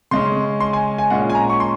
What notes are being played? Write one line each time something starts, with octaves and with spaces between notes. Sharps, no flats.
C#3 G#3 C#4 C6
C6
G#5
G#5
A#2 G#3 C#4 F#5
G#5
A#5
C#6
C6